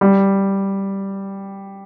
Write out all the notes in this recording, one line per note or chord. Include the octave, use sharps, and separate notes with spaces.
G3